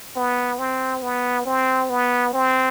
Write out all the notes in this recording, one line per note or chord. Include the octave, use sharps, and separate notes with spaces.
B3
C4
B3
C4
B3
C4